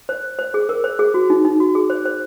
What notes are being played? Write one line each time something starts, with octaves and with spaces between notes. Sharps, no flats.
C5
C5
G#4
A#4
C5
G#4
F#4
D#4
D#4
F#4
G#4
C5
C5